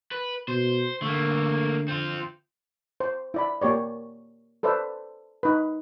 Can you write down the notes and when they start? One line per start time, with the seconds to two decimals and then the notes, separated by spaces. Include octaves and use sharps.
0.11 B4
0.48 B2 C5
1.02 D3 A3 A#3
1.88 C4 F4
3.00 C5
3.34 E4 D5 B5
3.61 A#3 G4 C#5 D5
4.63 A4 B4 C5 D5 E5
5.43 D#4 B4